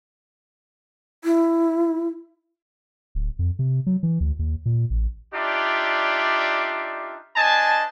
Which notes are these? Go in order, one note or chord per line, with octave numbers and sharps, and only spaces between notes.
E4
D1
F2
C3
F#3
E3
D2
D#2
A#2
A1
D4 D#4 F4 G4 D5 E5
D4 C5 D#5 G#5 A5